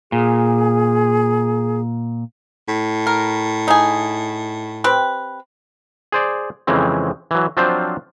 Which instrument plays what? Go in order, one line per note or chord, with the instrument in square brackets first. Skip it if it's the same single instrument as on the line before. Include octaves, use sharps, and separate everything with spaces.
[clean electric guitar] A#2 [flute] G#4
[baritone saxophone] A2
[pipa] A#4
D#4 G#4
C4 G4 B4
[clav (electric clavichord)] G#4 C5 D5
F2 C#3 E3 G#3 C4
E3 F#3
F3 F#3 C4 D4 F4 C5